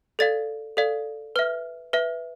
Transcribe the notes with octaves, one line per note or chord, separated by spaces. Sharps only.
A4 D5 F5 A6
A4 D5 F5
B4 E5 F6
B4 E5